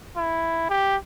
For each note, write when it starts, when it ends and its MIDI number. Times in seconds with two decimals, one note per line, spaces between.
0.17 0.68 64
0.69 0.96 67